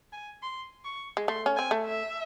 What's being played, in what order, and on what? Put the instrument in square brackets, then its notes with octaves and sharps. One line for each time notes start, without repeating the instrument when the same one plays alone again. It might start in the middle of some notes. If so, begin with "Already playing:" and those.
[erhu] G#5
C6
C#6
[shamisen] G#3
[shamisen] A3 [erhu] C6
[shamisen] C#4
[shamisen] C4 [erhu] G#5
[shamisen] A3
[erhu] E5